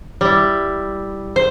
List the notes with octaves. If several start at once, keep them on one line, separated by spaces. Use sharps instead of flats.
G3 E4
C5